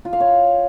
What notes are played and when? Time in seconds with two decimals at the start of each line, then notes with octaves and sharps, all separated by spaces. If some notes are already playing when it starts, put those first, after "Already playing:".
0.05 F4
0.13 F5
0.20 C#5